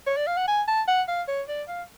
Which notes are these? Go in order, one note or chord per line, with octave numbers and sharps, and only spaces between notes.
C#5
D5
F5
F#5
G#5
A5
F#5
F5
C#5
D5
F5